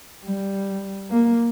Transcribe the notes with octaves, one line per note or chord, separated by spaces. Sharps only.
G3
A#3